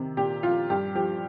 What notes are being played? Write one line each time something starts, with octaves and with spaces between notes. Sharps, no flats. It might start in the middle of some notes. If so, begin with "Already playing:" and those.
Already playing: C3 D#3
A#2 G4
F3 F4
G2 G4
F3 G4